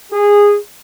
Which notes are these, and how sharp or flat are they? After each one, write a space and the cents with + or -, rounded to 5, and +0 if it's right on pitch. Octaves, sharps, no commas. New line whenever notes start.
G#4 -15